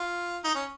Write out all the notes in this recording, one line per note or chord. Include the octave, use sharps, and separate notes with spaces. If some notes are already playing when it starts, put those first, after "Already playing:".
Already playing: F4
D#4
C#4